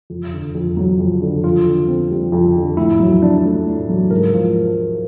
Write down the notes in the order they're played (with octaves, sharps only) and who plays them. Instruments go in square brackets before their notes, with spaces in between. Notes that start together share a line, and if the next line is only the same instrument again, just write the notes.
[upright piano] F2
D3
F2
F#3
F2
D3
[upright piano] F2 [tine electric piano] F4
[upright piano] D3
C4
G3
F2
D3
[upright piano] A2 [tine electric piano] E4
[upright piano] F#3
D4
A3
A2
F#3
[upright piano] G#2 [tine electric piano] A#4
[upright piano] F3